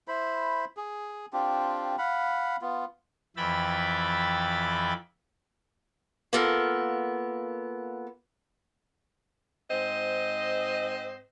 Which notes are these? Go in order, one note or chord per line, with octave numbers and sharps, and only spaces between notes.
E4 C5 B5
G#4
C4 D4 F4 G4
F5 F#5 B5
B3 F4
F2 E3 E5 G5 B5 A6
A#3 B3 F4 A4 A#4
G#2 C4 C5 D#5